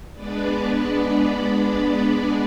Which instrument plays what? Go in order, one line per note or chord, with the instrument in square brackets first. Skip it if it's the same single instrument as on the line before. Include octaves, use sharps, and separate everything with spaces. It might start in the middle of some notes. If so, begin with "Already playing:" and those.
[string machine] G#3 B3 D4 B4 D5